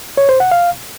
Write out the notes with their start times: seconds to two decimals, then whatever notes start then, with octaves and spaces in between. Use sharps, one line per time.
0.17 C#5
0.29 C5
0.40 F#5
0.51 F5